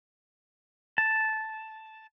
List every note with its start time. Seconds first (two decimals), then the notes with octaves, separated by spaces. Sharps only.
0.98 A5